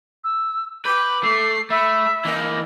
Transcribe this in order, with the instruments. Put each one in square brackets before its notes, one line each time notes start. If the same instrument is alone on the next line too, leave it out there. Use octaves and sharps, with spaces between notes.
[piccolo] E6
[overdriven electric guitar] B4 [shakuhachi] D6 [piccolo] G6
[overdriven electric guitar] A3 [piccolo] C7
[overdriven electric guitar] A3 [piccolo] E5 [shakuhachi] B5
[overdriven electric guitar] E3 A#3 [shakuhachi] D#5